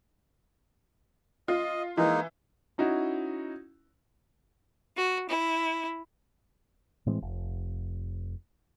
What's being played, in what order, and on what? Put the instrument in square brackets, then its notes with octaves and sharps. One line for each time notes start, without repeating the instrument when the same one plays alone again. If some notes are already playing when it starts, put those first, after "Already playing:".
[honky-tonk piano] F4 [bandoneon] D#5
[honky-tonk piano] E3 [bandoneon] G#3 A#3 D#4
[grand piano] C#4 D#4 E4 F#4
[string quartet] F#4
E4
[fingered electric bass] A2 E3 G#3 C4
F1